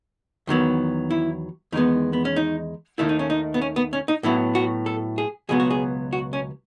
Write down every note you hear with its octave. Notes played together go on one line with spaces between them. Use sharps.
E2 D#3 F#3 B3
E4
E2 D#3 G#3 B3 D#4
B3
C#4
D#4
D#2 D#3 A3 E4
D#4
C#4
D#4
B3
C#4
B3
C#4
D#4
A2 F#3 B3 E4
F#4
A4
G#4
C#2 B2 F#3 B3 G#4
F#4
G#4
F#4
C#4